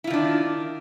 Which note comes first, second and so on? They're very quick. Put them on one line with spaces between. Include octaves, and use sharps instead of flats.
E4 F4 D#3 D4